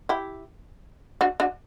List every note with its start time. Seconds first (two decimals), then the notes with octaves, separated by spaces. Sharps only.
0.09 E4 G4
1.21 D4 F#4
1.40 D4 F#4